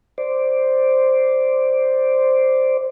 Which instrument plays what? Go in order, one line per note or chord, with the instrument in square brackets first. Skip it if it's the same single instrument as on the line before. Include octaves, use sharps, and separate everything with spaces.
[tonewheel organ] C5 D5